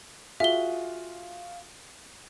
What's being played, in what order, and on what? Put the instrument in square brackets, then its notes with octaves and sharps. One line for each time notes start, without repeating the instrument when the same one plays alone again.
[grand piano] F4 F#4 G#4 [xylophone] E5 G7